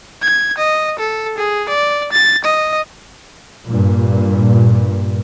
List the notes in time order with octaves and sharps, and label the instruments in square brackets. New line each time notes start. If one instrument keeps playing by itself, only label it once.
[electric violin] G#6
D#5
A4
G#4
D5
A6
D#5
[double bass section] G2 A#2